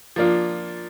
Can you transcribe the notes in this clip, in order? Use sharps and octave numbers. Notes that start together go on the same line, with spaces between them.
F3 A#3 D4 F4